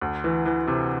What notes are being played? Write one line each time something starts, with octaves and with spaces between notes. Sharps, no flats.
D2
E3
E3
C3